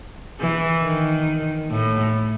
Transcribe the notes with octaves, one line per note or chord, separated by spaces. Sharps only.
E3
D#3
A2